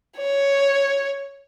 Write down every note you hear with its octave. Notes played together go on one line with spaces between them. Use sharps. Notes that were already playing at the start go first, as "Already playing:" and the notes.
C#5